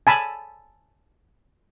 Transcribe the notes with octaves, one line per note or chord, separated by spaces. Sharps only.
G#5 A5 B5